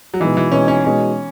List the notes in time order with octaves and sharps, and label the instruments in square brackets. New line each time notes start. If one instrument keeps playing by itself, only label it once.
[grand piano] F#3
[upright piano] B2 G#3 D#4 [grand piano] E3
[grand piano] E3
[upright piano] B2 G#3 D#4 [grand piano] C#4
[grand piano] C#4
[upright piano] B2 G#3 D#4 [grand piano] C#4